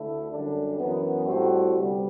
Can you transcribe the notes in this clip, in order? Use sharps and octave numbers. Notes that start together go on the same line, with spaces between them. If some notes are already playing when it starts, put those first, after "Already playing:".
Already playing: D2 D3 A3 E4 A4
F#2 D3 G3 D4
F#2 E3 B3
A2 G3 C4 F#4
D2 C3 G3 B3